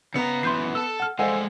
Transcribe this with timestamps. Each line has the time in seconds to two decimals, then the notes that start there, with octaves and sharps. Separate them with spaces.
0.14 C#3 B3 A#5 C#7
0.43 F#2 E3 C6 G6 C7
0.75 A4 A5 E6
1.00 F#5 F6
1.19 G3 G#3 A4 C5 D#5 F5 F#5 G#5